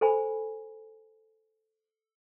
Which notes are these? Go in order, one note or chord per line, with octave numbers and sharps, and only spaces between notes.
A4 C5 G#5 B5